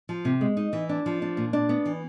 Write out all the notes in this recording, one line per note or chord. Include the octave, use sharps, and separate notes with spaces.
F3
C3
G#3
D#4
E3
D4
F3
D4
A#2
D4
B3
E3